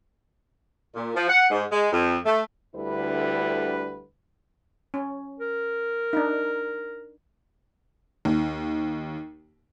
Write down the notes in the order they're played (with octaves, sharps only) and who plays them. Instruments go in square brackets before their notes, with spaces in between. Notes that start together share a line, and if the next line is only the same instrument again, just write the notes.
[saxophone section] A#2
F3
F#5
G#2
G#3
F2
A3
[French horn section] D2 D3 G3 E4 B4
[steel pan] C#4
[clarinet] A#4
[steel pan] D4 D#4
[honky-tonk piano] D#2